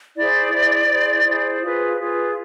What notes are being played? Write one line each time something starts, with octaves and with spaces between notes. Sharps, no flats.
E4 G#4 C5 D5
E4 G#4 C5
E4 G#4 C5
E4 G#4 C5
F4 G#4 B4
F4 G#4 B4